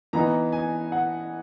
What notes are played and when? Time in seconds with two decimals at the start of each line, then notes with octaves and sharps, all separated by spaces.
0.13 E3 B3 D#4 A#5
0.52 G#5
0.92 F#5